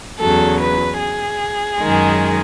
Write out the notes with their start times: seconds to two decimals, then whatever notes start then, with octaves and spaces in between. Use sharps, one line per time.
0.19 E2 C#3 F#3 A4
0.60 B4
0.99 G#4
1.80 F#2 D#3 G#3